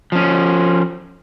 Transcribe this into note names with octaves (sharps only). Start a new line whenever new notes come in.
F3 C#4